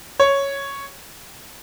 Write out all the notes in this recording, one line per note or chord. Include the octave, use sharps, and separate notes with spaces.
C#5